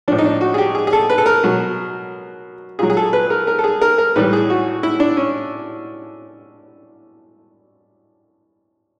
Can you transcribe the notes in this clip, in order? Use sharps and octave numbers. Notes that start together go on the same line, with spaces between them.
A2 F3 D4
D#4
D4
F#4
G#4
G4
G#4
G#4
A4
B4
A4
A#4
B2 F#3
A#2 F#3 G#4
G#4
A4
B4
A#4
A#4
A4
G#4
A#4
A#4
A2 E3 G3 B4
G#4
F#4
E4
D4
C#4